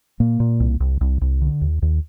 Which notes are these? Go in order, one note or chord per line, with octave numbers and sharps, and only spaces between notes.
A#2 A#3
A#2
C2
C2
C2
C2
D3
D#2
D#2